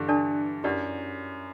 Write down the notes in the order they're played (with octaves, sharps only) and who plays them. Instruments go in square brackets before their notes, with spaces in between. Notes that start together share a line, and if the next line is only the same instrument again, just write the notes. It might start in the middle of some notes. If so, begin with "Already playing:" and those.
Already playing: [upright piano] G2 D3 E3
[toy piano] D4 A4 D5 A5
[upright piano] F#2 [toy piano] E4 G4 B4 D5 F#5